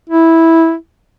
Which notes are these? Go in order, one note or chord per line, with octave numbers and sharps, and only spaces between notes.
E4